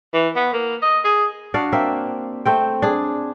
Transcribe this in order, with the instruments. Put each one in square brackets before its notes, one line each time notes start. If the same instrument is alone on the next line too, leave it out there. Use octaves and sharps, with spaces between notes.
[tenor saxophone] E3
B3
A#3
D#5
G#4
[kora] D4 F#4 D5 F5
A#3 C4 E5
A3 C4 G5
D4 G#4